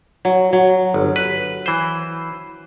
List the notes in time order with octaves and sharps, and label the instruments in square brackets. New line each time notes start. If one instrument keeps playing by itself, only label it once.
[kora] F#3
F#3
[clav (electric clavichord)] G1
B4
E3 C5